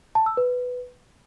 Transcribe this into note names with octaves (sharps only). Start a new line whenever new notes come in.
A5
E6
B4